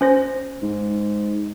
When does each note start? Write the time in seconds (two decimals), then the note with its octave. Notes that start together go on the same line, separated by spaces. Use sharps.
0.01 C#4 C5 A#6
0.62 G#2